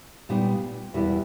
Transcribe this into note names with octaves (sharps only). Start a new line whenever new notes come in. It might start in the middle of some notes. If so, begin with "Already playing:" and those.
A#2 G3 B3 D#4
E2 B2 G3 B3 E4